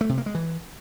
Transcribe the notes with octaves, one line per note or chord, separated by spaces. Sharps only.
A3
C3
A#3
G#3
E3